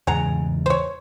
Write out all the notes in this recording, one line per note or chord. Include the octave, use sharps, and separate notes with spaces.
E2 G#2 C#3 G#4 F#5 A#5
C5 C#5